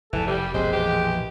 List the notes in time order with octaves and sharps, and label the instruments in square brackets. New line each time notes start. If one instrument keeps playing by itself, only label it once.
[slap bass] F1 [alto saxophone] E3 [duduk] A4
[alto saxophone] G3 [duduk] G4
[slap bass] A#1 F2 B2 [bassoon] G#3 [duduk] C4 [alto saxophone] C5
[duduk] E3 [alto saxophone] G4